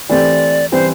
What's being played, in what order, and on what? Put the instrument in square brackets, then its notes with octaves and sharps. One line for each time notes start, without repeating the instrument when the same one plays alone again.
[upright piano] E3 A3 C4 G4 [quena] D5
[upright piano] E3 G3 C4 [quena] C5